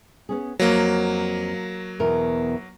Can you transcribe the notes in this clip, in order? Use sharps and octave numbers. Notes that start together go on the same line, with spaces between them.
B3 C#4 G#4
F2 F#3 A#3
E2 B2 A#4